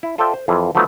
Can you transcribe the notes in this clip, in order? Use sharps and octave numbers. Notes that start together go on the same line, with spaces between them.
E4
F4 A4 C5 D5 E5 G5
C5
F2 E3 F4 G#4
F3 F#3 A3 B3 D#4